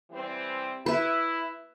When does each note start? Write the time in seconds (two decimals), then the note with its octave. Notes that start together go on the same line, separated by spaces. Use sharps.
0.11 E3 G3 C4
0.86 E4 B4 E5